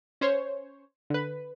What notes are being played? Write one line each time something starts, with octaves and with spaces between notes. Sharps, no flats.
C#4 C5 C#5
D3 B4